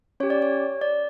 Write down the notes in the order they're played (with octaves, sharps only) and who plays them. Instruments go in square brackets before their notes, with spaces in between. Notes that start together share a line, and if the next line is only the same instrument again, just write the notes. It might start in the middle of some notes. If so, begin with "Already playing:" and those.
[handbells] C#4 G4 C#5
D5
C#5
D5